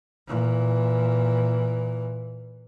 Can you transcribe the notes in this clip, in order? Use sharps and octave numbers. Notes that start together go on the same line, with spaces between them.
A#2 E3